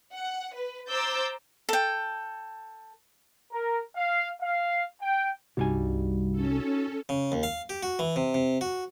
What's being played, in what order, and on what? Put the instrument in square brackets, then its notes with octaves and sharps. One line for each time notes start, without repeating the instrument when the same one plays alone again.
[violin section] F#5
B4
C5 A#5 D6 E6 G6 A6
[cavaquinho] A4 G5
[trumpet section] A#4
F5
F5
G5
[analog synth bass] C2 [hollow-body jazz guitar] G2 G3 G#5 [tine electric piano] D#4 F#4
[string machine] C#4 A4
[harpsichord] C#3
D#2
F5
G4
F#4
E3
C3
C3
F#4